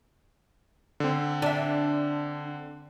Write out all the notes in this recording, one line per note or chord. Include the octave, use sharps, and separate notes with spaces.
D3 C4
D4 E5